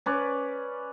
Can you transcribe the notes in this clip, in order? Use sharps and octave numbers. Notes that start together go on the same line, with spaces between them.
C#4 B4 D5